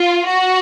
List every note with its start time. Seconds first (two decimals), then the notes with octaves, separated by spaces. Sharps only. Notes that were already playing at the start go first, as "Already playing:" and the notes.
Already playing: F4
0.26 F#4